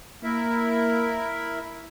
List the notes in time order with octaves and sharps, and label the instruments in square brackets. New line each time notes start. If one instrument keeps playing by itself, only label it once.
[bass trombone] A#3 [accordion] E4 A#4 E5